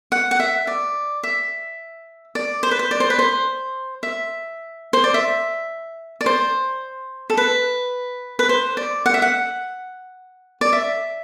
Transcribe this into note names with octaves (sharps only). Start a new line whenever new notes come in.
F#5
F#5
E5
D5
E5
D5
C5
B4
C5
D5
C5
B4
C5
E5
C5
D5
E5
D5
C5
A4
B4
B4
C5
D5
F#5
E5
F#5
D5
E5